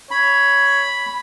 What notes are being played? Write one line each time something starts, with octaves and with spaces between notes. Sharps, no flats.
C#5 B5